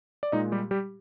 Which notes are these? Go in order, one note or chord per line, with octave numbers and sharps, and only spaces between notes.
D5
A#2 G#3 D#4 D#5
G3 G4
G3 G4